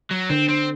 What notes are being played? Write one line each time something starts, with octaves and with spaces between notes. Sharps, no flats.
F#3
D3 C4
C4